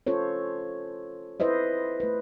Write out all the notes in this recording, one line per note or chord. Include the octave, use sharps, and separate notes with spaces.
C#4 F4 A4 C5 C#5
E4 B4 C5 D#5 E5
A3 B4